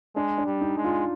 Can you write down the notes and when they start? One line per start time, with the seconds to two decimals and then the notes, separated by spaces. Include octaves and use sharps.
0.16 G#3 D4
0.38 D4
0.47 G3
0.61 D#4
0.77 G#3
0.84 F4